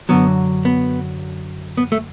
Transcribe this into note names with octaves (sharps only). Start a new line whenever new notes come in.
F#2 D3 F#3 B3
B3
B3
A3